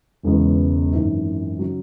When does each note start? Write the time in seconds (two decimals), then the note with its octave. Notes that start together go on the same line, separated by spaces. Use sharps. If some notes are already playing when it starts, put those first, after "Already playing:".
0.23 E1 E2 C#3 G#3 B3
0.91 G#1 F#2 E3
1.59 C#3 F#3